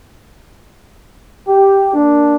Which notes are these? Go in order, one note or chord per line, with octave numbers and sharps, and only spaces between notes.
G4
A#3 D4